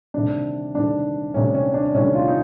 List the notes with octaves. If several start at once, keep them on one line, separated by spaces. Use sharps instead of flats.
D2 C3 D#3 G3 D4
D2 C3 D#3 G3 D4
D2 C3 D#3 G3 C#4
C#4
D4
D2 C3 D#3 G3 C#4
F4
D#4